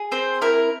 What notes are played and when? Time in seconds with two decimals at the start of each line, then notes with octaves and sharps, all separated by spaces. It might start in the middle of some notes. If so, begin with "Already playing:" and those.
Already playing: G#4
0.11 C4 C5
0.41 E4 A#4